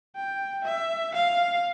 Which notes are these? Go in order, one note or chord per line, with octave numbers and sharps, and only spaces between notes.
G5
E5
F5